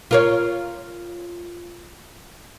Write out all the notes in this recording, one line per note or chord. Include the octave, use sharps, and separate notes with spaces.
F4 A#4 C#5